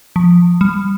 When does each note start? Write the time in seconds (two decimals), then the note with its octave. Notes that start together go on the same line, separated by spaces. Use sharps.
0.16 F3
0.61 G3